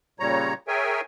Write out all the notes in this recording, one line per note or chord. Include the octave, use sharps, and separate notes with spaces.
A#2 C#3 G3 C#5 A#5
G#4 A#4 C#5 E5 G5 G#5